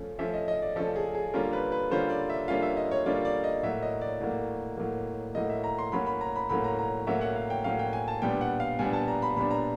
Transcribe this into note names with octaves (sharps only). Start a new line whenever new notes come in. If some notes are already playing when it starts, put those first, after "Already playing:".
Already playing: F3 A3 C#4
F3 A3 C#4 E5
D#5
D#5
D5
F3 A3 C#4 A4
G#4
G#4
D3 G3 A#3 C#4 F4 A#4
B4
B4
D3 G3 A#3 C#4 F4 C5
D5
E5
D3 G3 A#3 C#4 F4 F5
E5
D#5
C#5
D3 G3 A#3 C#4 F4 D5
D5
D#5
A2 F#3 A#3 E5
D#5
D5
A2 F#3 A#3
A2 F#3 A#3
A2 F#3 A#3 D#5
E5
A#5
C6
A2 F#3 A#3 C#4 B5
B5
A#5
B5
A2 F#3 A#3 C#4 B5
A#5
A#5
A2 F#3 A#3 C#4 E5
F#5
F5
G5
A2 F#3 A#3 C#4 F5
G5
G#5
A5
A#2 G3 B3 D4 G5
F#5
F5
A#2 G3 B3 D4 G#5
A5
A#5
B5
A#2 G3 B3 D4 B5
A#5